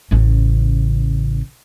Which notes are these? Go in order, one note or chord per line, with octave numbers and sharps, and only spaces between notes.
A1 C#3